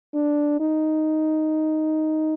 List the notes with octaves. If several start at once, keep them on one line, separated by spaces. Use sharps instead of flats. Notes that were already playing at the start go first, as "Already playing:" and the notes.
D4
D#4